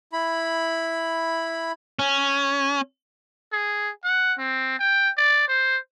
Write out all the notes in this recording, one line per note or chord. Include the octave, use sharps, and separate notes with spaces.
E4 B5
C#4
G#4
F#5
C4
G5
D5
C5